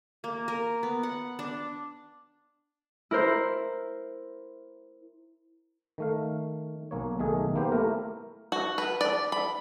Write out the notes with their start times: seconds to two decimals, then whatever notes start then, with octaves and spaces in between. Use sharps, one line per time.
0.24 A#3
0.48 A#4
0.83 B3
1.03 F#5
1.39 D4
3.11 E4 A#4 C5
5.98 D#3 A3 F5
6.91 B1 A#3 C#5
7.19 B1 D#3 A3 G#4
7.55 A#3 B3 G4 C5
7.72 A3 E4 A#4
8.52 F#4
8.78 B4
9.01 D5
9.32 B5